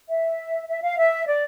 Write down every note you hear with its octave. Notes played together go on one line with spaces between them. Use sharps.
E5
E5
F5
E5
D5